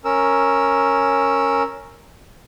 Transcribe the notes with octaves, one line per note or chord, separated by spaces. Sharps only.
C#4 A#4 E6